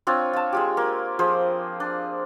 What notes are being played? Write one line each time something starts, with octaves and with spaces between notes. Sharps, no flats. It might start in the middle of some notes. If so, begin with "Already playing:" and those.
C4 D4 F4 C#5
F4 A5
G#3 F4 G4
A#3
F3 G#4 C5
D4